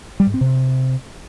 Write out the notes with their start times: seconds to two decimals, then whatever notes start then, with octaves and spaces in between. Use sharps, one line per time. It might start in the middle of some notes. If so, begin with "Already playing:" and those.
0.20 G3
0.27 G#2
0.34 C4
0.41 C3